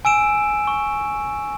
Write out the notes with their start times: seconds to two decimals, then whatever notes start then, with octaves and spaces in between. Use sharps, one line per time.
0.05 G#5 E6 D7 E7
0.67 C#6